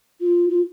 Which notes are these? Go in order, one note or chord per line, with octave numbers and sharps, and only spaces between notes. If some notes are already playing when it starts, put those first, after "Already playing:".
F4
F4